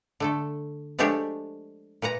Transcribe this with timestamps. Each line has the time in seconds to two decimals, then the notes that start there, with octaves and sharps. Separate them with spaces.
0.20 D3 A3 A4
0.99 F3 G#3 A3 D4 G4 C#5
2.02 A#2 B4 F#5 A#5